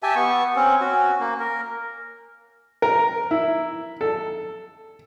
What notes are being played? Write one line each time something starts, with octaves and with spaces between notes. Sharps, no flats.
G4 E5 G#5 A5
B3 C#6
C4 C#4
C#4 F#4
A#3
A#4
A#4
E4
A4